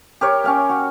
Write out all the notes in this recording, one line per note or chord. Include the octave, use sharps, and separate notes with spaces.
G4 A#4 C#5
C#4 F5 G5
F#4